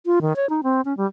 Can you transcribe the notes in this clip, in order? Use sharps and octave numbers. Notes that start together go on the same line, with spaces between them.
F4
D#3
C#5
D#4
C4
C#4
G3